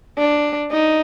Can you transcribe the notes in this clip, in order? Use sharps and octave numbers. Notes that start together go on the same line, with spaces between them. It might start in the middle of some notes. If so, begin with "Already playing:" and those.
D4
D#4